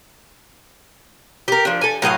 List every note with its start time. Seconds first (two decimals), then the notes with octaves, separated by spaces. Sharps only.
1.48 G4 A#4
1.65 F3 D4
1.81 A4 G#5
2.02 A2 F#3 D#5 F5